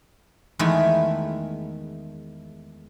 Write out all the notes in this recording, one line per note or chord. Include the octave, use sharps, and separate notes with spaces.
E2 D#3 G#3 A3 G#5 B5